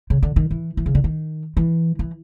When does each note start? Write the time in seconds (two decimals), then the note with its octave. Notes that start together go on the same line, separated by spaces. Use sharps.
0.10 C#3
0.23 D3
0.36 D#3
0.51 E3
0.77 E3
0.86 C#3
0.95 D3
1.04 D#3
1.57 E3
1.99 E3